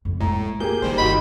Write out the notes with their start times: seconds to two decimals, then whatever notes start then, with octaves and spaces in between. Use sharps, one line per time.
0.05 F2 A2
0.21 A2 G#3 A#3 A#5
0.60 A#3 G4 G#4 G6
0.82 D#3 G3 D4 C5
0.98 G1 F#4 D#5 B5